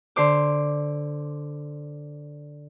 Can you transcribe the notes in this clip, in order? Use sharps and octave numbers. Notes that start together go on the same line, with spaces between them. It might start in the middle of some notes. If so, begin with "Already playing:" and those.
D3 C5 D6